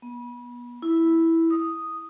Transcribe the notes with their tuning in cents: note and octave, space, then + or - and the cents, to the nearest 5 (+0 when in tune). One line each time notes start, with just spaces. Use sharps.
B3 -30
E4 -5
D#6 +0